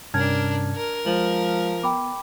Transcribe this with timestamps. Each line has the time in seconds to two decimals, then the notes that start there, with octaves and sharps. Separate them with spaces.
0.14 G2 C3 C#4 D4 A#4 A5 F6 G#6
0.76 A#4
1.06 F3 G#3 F#7
1.83 B3 G5 B5 D6